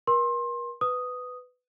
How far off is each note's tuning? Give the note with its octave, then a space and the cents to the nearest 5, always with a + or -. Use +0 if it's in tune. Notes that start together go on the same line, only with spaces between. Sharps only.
A#4 +40 C6 +25
B4 +15 D#6 +0